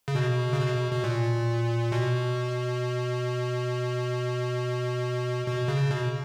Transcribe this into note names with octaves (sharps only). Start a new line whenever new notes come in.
C#3
B2
C#3
B2
B2
A#2
B2
B2
C#3
B2